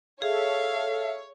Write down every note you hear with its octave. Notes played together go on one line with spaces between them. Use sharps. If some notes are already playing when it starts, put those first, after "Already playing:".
G#4 A4 C#5 E5 F5